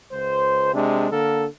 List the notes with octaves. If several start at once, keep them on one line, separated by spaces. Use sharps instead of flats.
C#2 C5
C3 G#3 D4
D3 A#3 A4 A#4